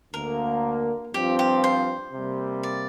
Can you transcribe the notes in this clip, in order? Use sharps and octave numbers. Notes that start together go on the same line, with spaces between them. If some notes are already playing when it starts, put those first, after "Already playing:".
D2 D3 A#3 A#4
G2 F3 C4 F4 G4
G4
C5
C3 G3 A#3
D5